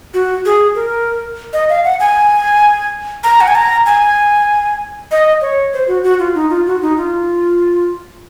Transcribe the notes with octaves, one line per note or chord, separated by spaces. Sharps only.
F#4
G#4
A#4
D#5
F5
F#5
G#5
A#5
F#5
G#5
A#5
G#5
D#5
C#5
C5
F#4
F#4
F4
D#4
F4
F#4
D#4
F4